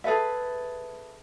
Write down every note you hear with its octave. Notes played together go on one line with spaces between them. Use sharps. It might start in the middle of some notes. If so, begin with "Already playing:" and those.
G#4 A4 B4 E5